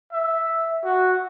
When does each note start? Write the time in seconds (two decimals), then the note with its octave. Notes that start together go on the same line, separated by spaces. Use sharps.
0.12 E5
0.84 F#4